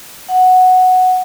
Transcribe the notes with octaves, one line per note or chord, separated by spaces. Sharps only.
F#5